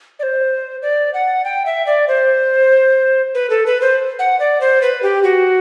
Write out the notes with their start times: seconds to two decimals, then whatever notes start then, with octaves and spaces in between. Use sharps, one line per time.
0.19 D5
0.23 C5
0.82 D5
1.14 F#5
1.45 G5
1.66 E5
1.87 D5
2.08 C5
3.35 B4
3.50 A4
3.66 B4
3.82 C5
4.19 F#5
4.39 D5
4.61 C5
4.82 B4
5.03 G4
5.23 F#4